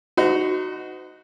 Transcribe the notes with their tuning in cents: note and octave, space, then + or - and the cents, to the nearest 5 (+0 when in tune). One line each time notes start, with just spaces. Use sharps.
D#4 +0 F#4 +0 C5 -40